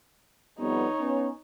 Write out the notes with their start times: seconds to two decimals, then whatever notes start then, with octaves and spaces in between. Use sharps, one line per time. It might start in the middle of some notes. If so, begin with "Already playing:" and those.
0.59 F2 G3 B3 D#4 C#5
0.99 B3 C#4